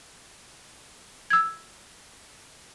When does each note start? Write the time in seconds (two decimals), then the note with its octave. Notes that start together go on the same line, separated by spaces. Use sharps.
1.30 E6 G#6